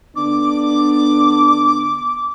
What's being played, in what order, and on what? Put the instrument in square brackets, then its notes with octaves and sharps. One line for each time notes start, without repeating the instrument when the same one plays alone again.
[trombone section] D3 B3 D4 [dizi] D6